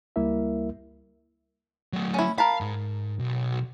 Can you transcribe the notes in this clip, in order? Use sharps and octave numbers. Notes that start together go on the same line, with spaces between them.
C#2 G3 A#3 E4 A#4 E5
F#3 A3
C#4 E4
A#4 F5 A5 B5
G#2
B1